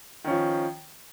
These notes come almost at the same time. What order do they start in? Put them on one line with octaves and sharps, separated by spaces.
D#3 C#4 F3